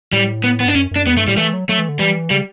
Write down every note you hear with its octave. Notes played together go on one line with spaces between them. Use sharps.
A2 G3
B3
B3
G2 D4
F#2 C#4
F#2 D4
E2 B3
G2 A3
A2 G3
E3 A3
F#3
F#3 A3
E3
D3
E3 G3
C#3 G3